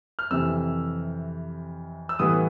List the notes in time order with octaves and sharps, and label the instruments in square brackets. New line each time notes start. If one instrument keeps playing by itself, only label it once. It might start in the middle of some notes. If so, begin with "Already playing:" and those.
[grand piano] F6
F2 C3 E3 E6
E6
A2 E3 G3 B3 D#6